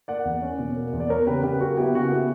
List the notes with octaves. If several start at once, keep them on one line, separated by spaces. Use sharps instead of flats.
A#3 D5 F#5
E2
C#4
B2
A#3
E2
D5
B3 A#4 C#5
C#3 G4 B4
C#3 G4 B4
F#3 F#4 A#4
B3 E4 G4
C#3 F#4
B3 E4